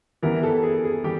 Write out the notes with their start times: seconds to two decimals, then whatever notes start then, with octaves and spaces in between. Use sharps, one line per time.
0.22 E3 G3 B3 E4 A#4
0.43 A4
0.63 G#4
0.84 G#4
1.03 E3 G3 G4